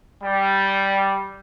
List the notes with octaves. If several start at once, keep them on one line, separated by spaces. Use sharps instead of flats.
G3